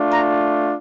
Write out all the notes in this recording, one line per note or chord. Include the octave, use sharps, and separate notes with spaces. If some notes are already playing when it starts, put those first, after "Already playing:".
Already playing: A3 D4 F4
A#5